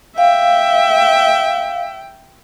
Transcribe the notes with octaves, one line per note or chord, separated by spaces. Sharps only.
E5 F5 G5